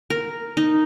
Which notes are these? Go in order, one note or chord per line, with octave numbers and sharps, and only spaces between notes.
A#4
D#4